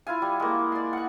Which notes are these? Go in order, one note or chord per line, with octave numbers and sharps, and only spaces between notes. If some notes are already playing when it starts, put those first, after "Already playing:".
E4 F4 F5 G#5
G3
G#3 A#3
D5 C6
F#5 C#6